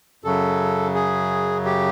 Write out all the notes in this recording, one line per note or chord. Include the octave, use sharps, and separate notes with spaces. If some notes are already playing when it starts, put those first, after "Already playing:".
F#2 C#3 F#3 A4
G#4
G4